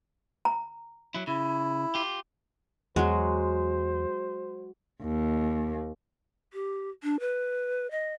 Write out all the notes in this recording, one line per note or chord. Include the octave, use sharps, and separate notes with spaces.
A#5
F#3 E4
C#3 E4
F4 G4
E2 F#3 G#3 F#4 C5
D#2
G4
D4
B4
D#5